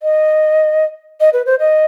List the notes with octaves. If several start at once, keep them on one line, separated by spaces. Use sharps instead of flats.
D#5
D#5
B4
C5
D#5